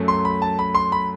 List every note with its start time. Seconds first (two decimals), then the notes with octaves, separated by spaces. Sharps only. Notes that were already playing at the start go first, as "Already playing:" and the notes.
Already playing: F#2 F#3 A3
0.08 C6
0.25 B5
0.42 A5
0.59 B5
0.75 C6
0.92 B5